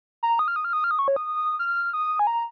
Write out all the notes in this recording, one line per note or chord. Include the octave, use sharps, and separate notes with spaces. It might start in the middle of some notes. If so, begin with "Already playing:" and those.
A#5
D#6
F6
D#6
F6
D#6
F6
D#6
C#6
C#5
D#6
F6
D#6
G#5
A#5